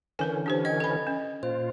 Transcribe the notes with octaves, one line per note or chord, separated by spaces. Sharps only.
D3 E3 C#4 A#4 B4 G#5
D4 G4 C5
D#5 G5 G#6
A4 D#5 B5
C#4
A#2 F4 C5